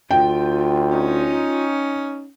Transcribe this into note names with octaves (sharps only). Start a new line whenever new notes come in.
D2 F4 G5
C#4 D#4